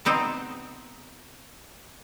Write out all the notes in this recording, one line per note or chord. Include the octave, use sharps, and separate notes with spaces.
C3 B3 C4 D#4